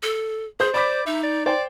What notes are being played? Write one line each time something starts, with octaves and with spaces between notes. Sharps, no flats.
A4
G#4 C5 G6
C5 D5 B5 D6 B6
D#4 E5
D5
C5 D5 G5